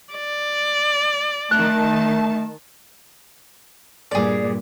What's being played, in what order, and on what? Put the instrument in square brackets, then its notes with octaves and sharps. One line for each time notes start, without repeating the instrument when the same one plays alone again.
[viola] D5
[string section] D#3 A5 [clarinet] A3 [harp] F#6
[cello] G2 A#2 [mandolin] G#4 D5